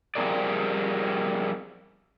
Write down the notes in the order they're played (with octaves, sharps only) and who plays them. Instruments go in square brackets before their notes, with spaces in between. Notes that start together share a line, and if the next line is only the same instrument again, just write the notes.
[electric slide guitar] F3 G3 C4 G#4 A#4 D5